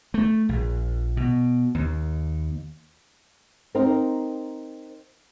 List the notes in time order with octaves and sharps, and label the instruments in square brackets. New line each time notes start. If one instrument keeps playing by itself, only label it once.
[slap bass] A3
A#1
B2
D#2
[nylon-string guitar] C4 D#4 A#4